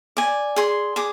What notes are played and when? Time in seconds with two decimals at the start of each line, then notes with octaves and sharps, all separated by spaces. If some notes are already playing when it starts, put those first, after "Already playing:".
0.17 D5 G#5
0.56 G#4 C6
0.96 G#4 D6